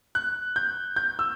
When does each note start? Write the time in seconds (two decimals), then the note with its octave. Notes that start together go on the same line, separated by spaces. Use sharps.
0.15 F#6
0.56 G6
0.96 G6
1.19 E6